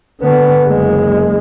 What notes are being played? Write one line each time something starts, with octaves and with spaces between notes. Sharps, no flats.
D3 B3
F#1 G#3